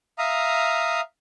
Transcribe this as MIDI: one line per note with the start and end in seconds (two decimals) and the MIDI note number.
0.18 1.01 76
0.18 1.01 77
0.18 1.01 82
0.18 1.01 87